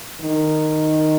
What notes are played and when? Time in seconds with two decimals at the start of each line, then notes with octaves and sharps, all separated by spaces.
0.21 D#3